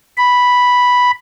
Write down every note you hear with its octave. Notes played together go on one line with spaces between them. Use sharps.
B5